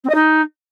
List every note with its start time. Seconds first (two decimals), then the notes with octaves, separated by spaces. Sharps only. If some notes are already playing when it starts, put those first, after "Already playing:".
0.04 C4
0.09 D#5
0.14 D#4